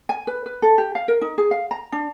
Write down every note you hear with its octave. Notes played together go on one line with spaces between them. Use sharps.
G#5
B4
B4
A4
G4
F5
A#4
D#4
G#4
F5
A#5
D4